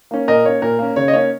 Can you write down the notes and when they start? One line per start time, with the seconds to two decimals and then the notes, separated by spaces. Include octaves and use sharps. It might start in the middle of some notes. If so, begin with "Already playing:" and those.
0.11 A#3 C#4
0.28 A#2 A#4 D#5
0.45 A#3 C#4 C#5
0.62 A#2 A#4
0.79 A#3 C#4
0.96 C#3 C#5
1.08 D#5
1.13 A#3 C#4 C#5